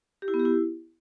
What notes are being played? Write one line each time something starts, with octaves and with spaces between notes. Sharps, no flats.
G4
E4
B3
G4
E4